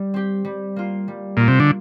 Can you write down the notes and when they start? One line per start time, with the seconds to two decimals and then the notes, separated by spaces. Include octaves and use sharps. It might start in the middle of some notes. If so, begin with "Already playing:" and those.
Already playing: G3
0.14 C4 G4
0.45 G3
0.76 A#3 F4
1.08 G3
1.37 A#2 A#3 F4
1.48 C3
1.60 D3